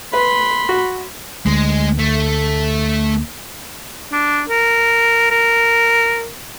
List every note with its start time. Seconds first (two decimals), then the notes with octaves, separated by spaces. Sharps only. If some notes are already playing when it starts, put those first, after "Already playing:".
0.13 B4 B5 C6
0.69 F#4
1.46 D2 G#3
1.99 A3
4.12 D4
4.50 A#4
5.31 A#4